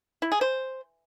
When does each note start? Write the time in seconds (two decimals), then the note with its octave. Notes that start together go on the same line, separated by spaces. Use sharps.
0.22 E4
0.32 G#4
0.41 C5